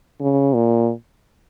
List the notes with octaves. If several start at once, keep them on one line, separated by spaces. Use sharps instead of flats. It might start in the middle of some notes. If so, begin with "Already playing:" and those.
C#3
A#2